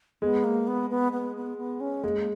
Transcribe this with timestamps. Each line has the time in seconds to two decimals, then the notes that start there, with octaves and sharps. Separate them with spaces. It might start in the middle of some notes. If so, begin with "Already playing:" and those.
0.22 G#3 B3
0.44 A#3
0.67 B3
0.90 B3
1.12 B3
1.36 B3
1.58 B3
1.80 C#4
2.03 G#3 A#3
2.18 A#3